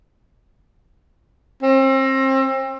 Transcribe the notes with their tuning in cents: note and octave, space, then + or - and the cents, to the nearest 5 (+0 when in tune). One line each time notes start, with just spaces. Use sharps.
C4 +35